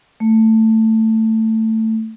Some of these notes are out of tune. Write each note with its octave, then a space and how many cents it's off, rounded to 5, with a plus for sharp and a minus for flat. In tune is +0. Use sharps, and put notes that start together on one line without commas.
A3 +15